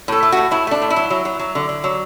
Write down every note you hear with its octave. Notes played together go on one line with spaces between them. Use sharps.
A2 A4
A3
A2 F#4
A2 E4
A3 D4
A2
E4
F#3
F#3
F#3
F#3
D3
D3
F#3